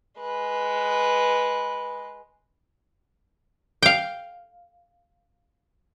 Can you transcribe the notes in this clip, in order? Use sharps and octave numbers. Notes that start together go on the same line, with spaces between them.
G#3 B4
F5 G5